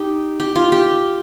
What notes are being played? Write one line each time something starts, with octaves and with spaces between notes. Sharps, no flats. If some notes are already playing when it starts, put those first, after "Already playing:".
Already playing: D#4 G4
G4
F4
G4